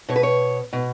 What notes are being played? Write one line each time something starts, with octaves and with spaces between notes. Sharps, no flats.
B2 C#5
B4
C#5
B2